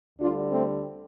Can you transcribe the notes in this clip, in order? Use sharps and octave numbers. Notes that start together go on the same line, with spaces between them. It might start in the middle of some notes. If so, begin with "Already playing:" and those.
D2 D3 G3 D4 F4
A3 C4